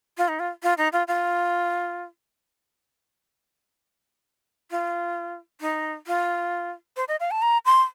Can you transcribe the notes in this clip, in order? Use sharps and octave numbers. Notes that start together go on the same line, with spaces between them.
F4
D#4
F4
F4
D#4
F4
F4
F4
D#4
F4
C5
D#5
F5
A5
A#5
C6